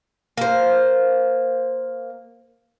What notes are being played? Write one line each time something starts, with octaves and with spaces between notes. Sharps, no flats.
A#3 C5